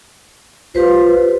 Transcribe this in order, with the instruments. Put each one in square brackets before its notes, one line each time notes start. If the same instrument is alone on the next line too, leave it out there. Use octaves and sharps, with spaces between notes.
[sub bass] B1 [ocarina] F4 [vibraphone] G4 B4 C5